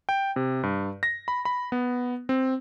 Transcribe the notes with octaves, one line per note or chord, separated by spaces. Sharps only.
G5
C3
G2
A#6
B5
B5
B3
C4